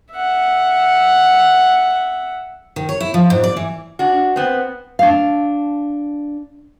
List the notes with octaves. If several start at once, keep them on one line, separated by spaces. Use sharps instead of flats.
E5 F#5
D#3
C#5
E4
F3
G#2
D5
E3
D4 F#4
B3 C4
D4 F5